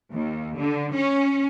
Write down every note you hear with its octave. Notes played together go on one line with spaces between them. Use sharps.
D#2
D3
C#4